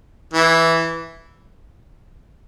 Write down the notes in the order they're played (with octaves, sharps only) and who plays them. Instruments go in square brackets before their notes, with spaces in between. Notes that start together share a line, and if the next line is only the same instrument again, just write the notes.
[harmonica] E3